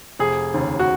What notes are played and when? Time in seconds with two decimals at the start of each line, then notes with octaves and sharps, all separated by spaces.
0.19 F1 G#4
0.54 D#2 C#3
0.79 F#4